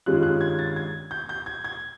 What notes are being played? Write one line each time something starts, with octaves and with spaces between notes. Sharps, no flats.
G2 D#3 G#3 C#4 F4 F#6
F#6
G#6
A6
G#6
G6
G6
G#6
G#6